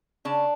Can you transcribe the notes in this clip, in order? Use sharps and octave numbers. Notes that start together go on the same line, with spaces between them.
C#3 D4